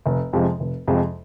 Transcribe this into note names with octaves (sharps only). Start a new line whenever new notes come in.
F1
F2 C3 F3 G#3
F1
F2 C3 F3 G#3